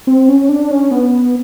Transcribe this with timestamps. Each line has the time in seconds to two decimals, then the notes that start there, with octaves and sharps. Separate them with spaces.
0.07 C4
0.29 C#4
0.49 D4
0.71 C#4
0.91 B3